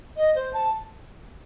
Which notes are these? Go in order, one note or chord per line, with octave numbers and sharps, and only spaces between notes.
D#5
C5
A5